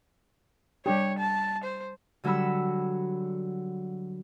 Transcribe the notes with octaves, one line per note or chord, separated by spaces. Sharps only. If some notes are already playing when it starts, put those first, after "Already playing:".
G3 D4 G4 C#5
A5
C5
D3 F#3 G3 F#4 B5 E6